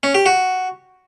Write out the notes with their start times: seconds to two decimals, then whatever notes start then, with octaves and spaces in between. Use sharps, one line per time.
0.03 C#4
0.15 G4
0.26 F#4